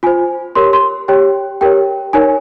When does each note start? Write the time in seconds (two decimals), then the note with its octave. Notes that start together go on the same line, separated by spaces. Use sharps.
0.03 F4 C5 G#5
0.55 G4 A#4 C#5 C6
0.73 C6
1.08 G4 C#5 G5
1.61 G4 A#4 C#5 G5
2.13 D#4 A#4 C#5 G#5